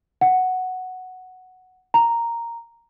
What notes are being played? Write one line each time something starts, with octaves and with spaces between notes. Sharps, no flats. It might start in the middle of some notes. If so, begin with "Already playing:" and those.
F#5
A#5